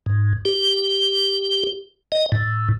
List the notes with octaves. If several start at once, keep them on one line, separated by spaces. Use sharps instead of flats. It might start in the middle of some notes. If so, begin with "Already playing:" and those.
G#2
G4
D#5
A2